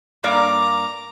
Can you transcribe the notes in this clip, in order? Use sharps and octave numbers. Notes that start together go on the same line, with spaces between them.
G2 A#3 D5 A#5 D6